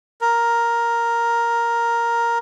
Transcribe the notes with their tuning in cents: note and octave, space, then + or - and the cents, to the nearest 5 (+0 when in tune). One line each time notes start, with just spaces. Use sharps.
A#4 +5